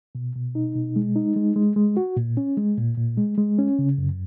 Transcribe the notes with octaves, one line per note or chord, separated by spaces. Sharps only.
B2
B2
D#4
B2
G#3
D#4
G#3
G#3
G#3
F#4
A#2
C#4
G#3
A#2
A#2
G#3
G#3
C#4
C#3
F#2